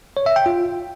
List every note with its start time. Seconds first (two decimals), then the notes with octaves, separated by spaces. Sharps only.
0.17 C#5
0.26 E5
0.36 G5
0.46 F4